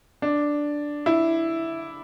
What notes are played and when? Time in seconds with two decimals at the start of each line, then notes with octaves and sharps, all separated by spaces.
0.22 D4
1.06 E4